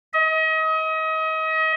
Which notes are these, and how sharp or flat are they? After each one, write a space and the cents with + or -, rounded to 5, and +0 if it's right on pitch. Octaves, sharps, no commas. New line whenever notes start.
D#5 +35